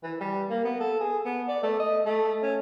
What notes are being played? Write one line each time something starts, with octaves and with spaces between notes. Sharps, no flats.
E3
G3
A#3
B3
A4
G#4
B3
D5
A3
D#5
A3
C#4